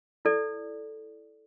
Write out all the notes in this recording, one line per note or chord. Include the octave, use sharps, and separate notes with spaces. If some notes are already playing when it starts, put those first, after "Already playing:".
E4 A4 D5